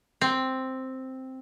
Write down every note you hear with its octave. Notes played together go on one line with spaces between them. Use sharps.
C4